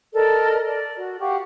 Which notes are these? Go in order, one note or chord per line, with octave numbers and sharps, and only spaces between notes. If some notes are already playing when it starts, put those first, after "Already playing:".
A4 A#4 D5 D#5
D5
F#4
G4 F5 F#5 C#6